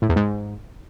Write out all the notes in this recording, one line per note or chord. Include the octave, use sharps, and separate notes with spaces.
A2
E2
G#2